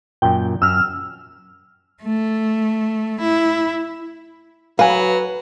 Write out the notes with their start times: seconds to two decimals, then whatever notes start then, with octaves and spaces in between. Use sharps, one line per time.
0.22 F#2 A#2 G5
0.62 F#2 E6 F6
2.03 A3
3.21 E4
4.79 F#3 B4 F5 G#5